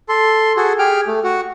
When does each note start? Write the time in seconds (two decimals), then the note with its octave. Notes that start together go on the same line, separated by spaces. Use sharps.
0.09 A4 C6
0.57 F#4 G#4 A4
0.79 G4 G#4 G5 F6
1.07 A3
1.24 F#4